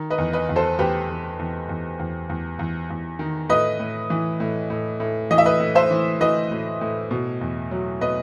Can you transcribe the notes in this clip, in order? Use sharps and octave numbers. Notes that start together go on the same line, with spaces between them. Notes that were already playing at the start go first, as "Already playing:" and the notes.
Already playing: D#3
B4 D#5
E2
B4 D#5
E2
A4 C5
E2 G4 B4
E2
E2
E2
E2
E2
E2
E2
D#3
A2 B4 D#5
A2
E3
A2
A2
A2
E3 D#5
E5
B4 D#5
A2
C5 E5
E3
E3 B4 D#5
A2
A2
B2
E2
F#3
B2 B4 D#5